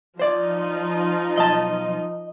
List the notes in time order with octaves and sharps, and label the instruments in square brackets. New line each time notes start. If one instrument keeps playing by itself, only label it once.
[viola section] F3 D#4 [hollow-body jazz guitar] C5 D5
[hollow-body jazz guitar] B1 A5 [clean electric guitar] D#5